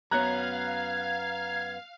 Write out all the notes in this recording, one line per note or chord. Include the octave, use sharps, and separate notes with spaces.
F#2 B3 C#5 F5 A#5 F#6 G#6